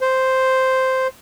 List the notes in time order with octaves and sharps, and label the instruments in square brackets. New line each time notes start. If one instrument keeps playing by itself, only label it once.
[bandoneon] C5